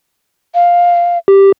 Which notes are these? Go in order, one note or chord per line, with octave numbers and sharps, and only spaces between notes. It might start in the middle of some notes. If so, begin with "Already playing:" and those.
F5
G4